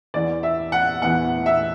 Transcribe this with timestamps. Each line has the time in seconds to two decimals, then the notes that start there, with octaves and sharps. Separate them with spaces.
0.14 E2 E3 B3 D5
0.43 E5
0.72 F#5
1.02 E2 E3 B3 F#5
1.46 E5